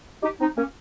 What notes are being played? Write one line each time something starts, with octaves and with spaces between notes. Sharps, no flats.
D#4 G4
C4 D#4
A#3 C#4